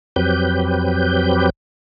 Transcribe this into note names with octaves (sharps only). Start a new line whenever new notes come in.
F2 F#3 C4 G4 B4 G6